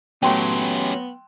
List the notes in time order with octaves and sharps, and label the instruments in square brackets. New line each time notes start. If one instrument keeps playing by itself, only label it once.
[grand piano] F#3 A3 [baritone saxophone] B3 [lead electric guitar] C#4 G4 [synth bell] G5 C6